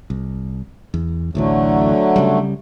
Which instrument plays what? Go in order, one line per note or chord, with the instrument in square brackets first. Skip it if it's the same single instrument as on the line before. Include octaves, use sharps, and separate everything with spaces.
[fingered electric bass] C2
E2
[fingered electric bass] A1 D2 E3 [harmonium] D3 F#3 A3
[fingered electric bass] C#3 G3